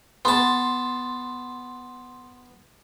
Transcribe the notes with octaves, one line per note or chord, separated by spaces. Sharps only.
B3 A5 C6